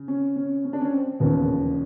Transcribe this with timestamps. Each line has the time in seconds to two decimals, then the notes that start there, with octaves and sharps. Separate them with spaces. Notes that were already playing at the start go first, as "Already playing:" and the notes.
Already playing: C#3
0.08 C#4
0.36 C#4
0.65 C#4
0.73 D4
0.81 C#4
0.93 C4
1.20 E1 D#2 C#3 F3 B3